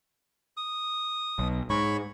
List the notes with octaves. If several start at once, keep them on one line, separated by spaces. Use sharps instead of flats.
D#6
B1
G#2 C#5 B5 C#6